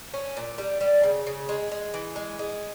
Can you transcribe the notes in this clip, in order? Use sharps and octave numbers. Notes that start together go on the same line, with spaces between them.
C#4
A#2
G3
G3
C#3
C#3
G#3
G#3
E3
G#3
G#3